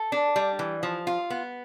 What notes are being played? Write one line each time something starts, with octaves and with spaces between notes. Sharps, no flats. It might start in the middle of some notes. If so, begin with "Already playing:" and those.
Already playing: A4
D4
G3
E3
F3
F4
B3